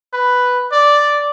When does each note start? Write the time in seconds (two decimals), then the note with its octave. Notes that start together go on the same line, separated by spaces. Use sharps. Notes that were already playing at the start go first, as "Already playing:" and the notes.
0.13 B4
0.72 D5